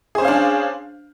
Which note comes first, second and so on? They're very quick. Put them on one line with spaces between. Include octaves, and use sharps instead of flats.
G#4 C5 C#4 F5 D4